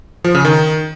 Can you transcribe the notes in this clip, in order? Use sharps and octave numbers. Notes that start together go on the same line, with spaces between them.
F3
C#3
D#3